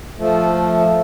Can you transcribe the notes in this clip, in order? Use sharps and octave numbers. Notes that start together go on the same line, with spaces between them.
F3 A3